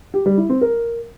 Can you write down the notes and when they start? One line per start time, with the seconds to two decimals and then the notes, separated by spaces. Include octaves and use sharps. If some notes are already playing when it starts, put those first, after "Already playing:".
0.14 G4
0.26 G3
0.38 E4
0.49 C4
0.61 A#4